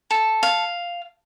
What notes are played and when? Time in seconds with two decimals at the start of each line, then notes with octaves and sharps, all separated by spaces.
0.11 A4
0.43 F5